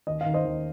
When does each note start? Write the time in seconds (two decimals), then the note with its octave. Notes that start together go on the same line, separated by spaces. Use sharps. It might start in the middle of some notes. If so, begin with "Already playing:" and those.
0.07 D#2 D#5
0.21 F5
0.26 D#3
0.34 C5 D#5
0.45 D#2